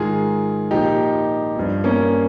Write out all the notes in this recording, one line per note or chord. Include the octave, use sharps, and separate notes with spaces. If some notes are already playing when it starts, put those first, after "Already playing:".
Already playing: G#2 D#3 F4 G#4
A#2 F3 D#4 G4
G2 F3
A#3 C#4